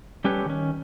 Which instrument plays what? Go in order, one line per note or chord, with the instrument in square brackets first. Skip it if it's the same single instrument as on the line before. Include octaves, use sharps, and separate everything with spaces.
[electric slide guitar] G3 C#4 G4 A4 B4 C#5
D#3 C#4